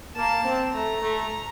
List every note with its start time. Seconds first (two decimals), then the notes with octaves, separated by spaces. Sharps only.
0.16 A#3 A5
0.44 C4
0.73 A3 A#5
1.01 A3